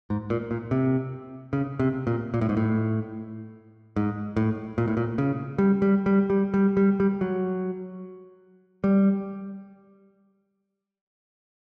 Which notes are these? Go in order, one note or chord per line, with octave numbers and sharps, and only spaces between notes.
G#2
A#2
A#2
C3
C#3
C3
A#2
A#2
A2
G#2
A2
G#2
A2
A#2
A2
A#2
C#3
G3
G3
G3
G3
G3
G3
G3
F#3
G3